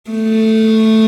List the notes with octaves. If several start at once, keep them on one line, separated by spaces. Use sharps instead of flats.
A3